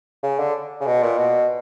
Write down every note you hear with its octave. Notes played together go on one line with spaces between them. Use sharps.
C#3
D3
C#3
B2
A#2
B2